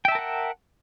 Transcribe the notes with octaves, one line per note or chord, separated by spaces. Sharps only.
A#4 E5 F#5 G5 A5